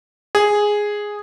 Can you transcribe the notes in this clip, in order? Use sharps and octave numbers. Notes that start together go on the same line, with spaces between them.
G#4